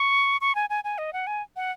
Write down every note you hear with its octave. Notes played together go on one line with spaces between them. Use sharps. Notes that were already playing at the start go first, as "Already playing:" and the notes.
Already playing: C#6
C#6
G#5
G#5
G#5
D#5
F#5
G#5
F#5